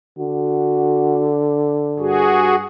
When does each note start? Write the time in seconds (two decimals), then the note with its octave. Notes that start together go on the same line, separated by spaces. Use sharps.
0.19 D3 F#4
1.99 G2 F#4 G#4